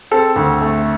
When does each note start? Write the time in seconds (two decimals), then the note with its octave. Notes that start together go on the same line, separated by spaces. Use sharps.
0.11 C4 A4
0.36 D2
0.61 A3